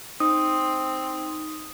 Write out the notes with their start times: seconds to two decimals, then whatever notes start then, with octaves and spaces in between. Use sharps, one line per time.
0.20 C4 D#4 D#6